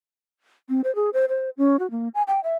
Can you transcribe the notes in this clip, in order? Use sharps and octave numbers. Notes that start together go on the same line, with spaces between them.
C4
C5
G#4
C5
C5
C#4
F#4
A#3
G#5
G5
E5